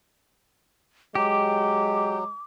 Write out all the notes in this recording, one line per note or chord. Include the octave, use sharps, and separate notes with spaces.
F#3 G#3 G4 D6